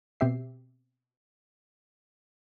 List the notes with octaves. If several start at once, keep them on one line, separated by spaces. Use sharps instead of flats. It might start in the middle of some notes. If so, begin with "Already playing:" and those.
B2 C4 G4 E5 C7